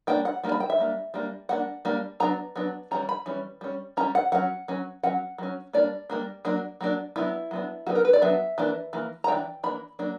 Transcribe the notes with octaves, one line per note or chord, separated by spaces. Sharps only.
G3 A#3 D4 G5
F#5
G3 A#3 D4
B5
G5
E5
G3 A#3 D4
G3 A#3 D4
G3 A#3 D4 F#5
G3 A#3 D4
F#3 B3 D4 A#5
F#3 B3 D4
E3 G3 C#4 A#5
B5
E3 G3 C#4
G3 C#4
G3 C#4 A#5
F#5
F#3 C#4 F#5
F#3 C#4
F#3 C#4 F#5
F#3 C#4
G3 A#3 D4 D5
G3 A#3 D4
F#3 A#3 D4
F#3 A#3 D4
F#3 B3 D4 E4
F#3 B3 D4
F#3 B3 D4 F#4
A#4
B4
D5
F#3 B3 D4 E5
E3 A#3 D4
E3 A#3
A#5
E3 A#3 D4 G5
E3 A#3 D4 B5
F#3 A#3 D4